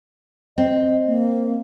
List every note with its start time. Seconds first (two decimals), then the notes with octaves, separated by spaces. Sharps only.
0.58 C4 D#5
1.07 A#3